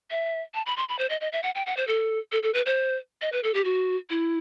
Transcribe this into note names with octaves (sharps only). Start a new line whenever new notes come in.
E5
A5
B5
C6
B5
C5
D#5
D#5
E5
F#5
G5
F#5
C5
A4
A4
A4
B4
C5
D#5
B4
A4
G4
F#4
E4